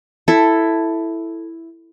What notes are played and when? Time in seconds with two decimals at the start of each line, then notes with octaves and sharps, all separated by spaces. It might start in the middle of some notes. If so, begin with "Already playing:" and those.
0.28 E4 A4